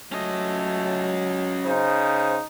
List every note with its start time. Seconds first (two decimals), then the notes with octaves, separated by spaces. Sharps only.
0.12 F#3 A3 C#4 D#5
1.65 C#3 D#4 C5